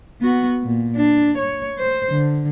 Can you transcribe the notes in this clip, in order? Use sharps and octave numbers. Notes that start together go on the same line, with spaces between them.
B3 F#4
A#2
D4
C#5
C5
D3